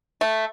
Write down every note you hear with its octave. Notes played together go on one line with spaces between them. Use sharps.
A3